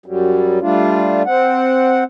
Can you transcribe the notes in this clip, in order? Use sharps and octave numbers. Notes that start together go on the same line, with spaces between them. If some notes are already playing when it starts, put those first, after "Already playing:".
F#2 F#3 G3
G3 A3 D4 F4
C4 F#5